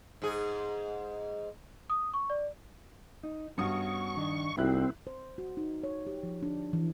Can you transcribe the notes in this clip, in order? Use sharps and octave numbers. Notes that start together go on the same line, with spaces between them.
G#2 G#4
D#6
C#6
D5
D#4
G2 B3 C#4 F#4 C#6 D#6
D#3 D4 D#4
C2 C4 D#4 E4 F#4 G4 F#6
C5
F#4
D#4
C#5
G4
F3
D4
E3